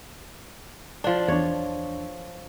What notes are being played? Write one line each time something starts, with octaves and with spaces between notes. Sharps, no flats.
F3 D4
E2 D4 C#5